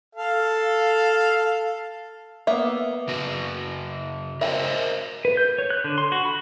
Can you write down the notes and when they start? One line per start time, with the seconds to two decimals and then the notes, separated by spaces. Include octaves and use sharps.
0.15 A4 F5
2.47 A#3 B3 E5
3.08 C#3 F#4
4.41 A#4 C5 D#5 E5 G#5 A5
5.25 B4
5.37 G6
5.58 C#5
5.70 F#6
5.84 D3
5.98 C6
6.12 F#4
6.25 B5